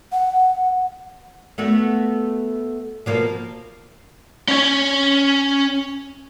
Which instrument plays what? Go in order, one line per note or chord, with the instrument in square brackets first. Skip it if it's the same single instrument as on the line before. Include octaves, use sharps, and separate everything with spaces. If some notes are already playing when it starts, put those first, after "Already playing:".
[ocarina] F#5
[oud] A3 B3 F#4
B2 F3 A#3
[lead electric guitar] C#4 C#5